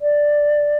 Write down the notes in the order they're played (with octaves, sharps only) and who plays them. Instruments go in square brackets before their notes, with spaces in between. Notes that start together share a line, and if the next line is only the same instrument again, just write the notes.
[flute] D5